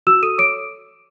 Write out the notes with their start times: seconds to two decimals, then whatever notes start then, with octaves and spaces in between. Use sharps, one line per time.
0.07 F#4 E6 E7
0.22 A4 D#6 D#7
0.38 C#5 D6 D7